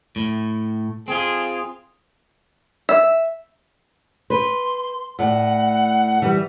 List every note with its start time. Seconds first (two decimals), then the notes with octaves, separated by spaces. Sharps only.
0.16 A2
1.08 C4 F4 G#4
2.89 E5
4.30 B4 C6
5.19 A2 D5 F#5
6.22 E3 G3